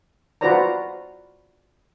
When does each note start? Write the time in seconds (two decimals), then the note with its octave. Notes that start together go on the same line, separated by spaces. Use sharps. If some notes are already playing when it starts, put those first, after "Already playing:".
0.41 F4 F#4 B4 C5 D5 A#5